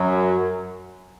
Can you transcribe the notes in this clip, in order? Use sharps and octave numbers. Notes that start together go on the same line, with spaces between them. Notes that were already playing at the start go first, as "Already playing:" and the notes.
Already playing: F#2 F#3